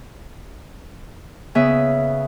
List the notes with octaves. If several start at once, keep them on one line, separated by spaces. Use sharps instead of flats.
C#3 B3 E5